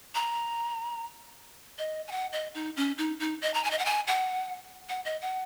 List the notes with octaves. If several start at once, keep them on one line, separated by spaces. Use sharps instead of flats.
A#5
D#5
G#5
F#5
D#5
D#4
C#4
D#4
D#4
D#5
A#5
G#5
D#5
F#5
G#5
F#5
F#5
D#5
F#5